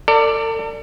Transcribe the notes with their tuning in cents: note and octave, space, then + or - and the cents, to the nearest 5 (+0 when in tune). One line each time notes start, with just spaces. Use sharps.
A4 +40 D5 +0